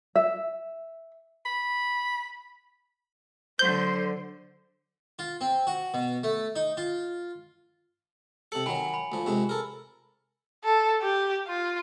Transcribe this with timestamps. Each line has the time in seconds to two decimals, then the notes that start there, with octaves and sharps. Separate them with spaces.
0.16 E5
1.45 B5
3.59 D3 F#3 C5 G6
5.19 F4
5.41 C4
5.67 F#4
5.94 B2
6.23 A3
6.56 D#4
6.77 F4
8.52 C3 A4 C#7 F#7
8.66 D#3 F#3 G#5 B5
8.94 B5
9.12 D2 F3
9.26 F2 C3 G#3
9.49 A4 A#4
10.64 A4
11.01 G4
11.48 F4